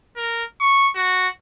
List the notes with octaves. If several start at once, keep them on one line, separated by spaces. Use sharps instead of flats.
A#4
C#6
F#4